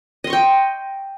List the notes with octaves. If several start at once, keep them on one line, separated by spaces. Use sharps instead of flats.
D#5 G5 C6 C#6